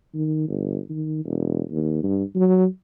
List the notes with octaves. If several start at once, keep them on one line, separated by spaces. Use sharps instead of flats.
D#3
G1
D#3
E1
D#2
G2
F#3